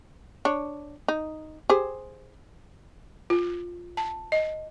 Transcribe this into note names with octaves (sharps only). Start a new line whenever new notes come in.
D4 C#5
D#4
G4 G#4 C5
F4
A5
D#5